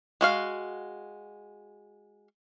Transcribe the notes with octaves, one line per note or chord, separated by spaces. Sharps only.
G#3 F#4 F5